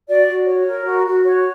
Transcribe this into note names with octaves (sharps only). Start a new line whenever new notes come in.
F#4 D5
F#4
C#5
A#4
F#4
F#4
C#5